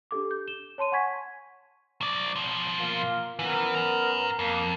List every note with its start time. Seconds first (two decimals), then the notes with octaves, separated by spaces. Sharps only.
0.11 D4 G4 A4 D6
0.31 G6
0.48 E7 G7
0.78 C#5 A5 C6 D#7
0.92 F#5 G#5 C#6 G#6 B6
2.01 F#3 D5
2.36 B2 F3
2.79 A#3 F4
3.39 F#2 E3 B3 A#4
3.75 G#5 A#5
4.39 F2 A#3